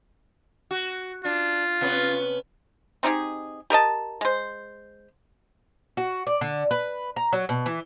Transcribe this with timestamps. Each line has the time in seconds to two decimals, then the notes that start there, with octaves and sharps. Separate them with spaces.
0.71 F#4
1.25 D4 F4
1.81 C3 B3 C#4
3.03 C4 D#4 G4 G#4
3.70 G4 A#4 D#5 A5
4.21 G#3 C5
5.97 F#4
6.27 D5
6.41 D3
6.71 B4
7.16 A#5
7.33 F#3
7.49 B2
7.66 E3